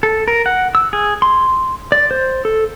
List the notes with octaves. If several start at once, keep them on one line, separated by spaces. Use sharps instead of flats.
A4
A#4
F#5
E6
G#4
C6
D5
C5
A4